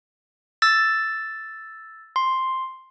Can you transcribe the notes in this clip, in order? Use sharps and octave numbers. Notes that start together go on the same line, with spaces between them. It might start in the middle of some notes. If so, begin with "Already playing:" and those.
E6 A6
C6